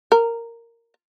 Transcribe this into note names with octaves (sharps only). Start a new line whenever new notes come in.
A#4